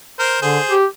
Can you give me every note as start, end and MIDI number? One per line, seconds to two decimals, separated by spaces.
0.19 0.39 70
0.19 0.39 72
0.42 0.59 50
0.42 0.75 68
0.42 0.75 72
0.69 0.85 67